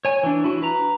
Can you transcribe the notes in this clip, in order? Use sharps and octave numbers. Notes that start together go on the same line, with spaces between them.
C#5 G#5
E3 D4
E4 F#4
B4 A#5